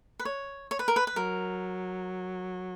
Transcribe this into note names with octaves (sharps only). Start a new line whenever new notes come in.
B4
C#5
C#5
B4
A#4
B4
B4
F#3 A#4